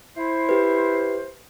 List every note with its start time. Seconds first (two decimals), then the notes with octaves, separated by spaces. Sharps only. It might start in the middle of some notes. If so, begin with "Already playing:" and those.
0.16 E4 C5
0.49 G4 B4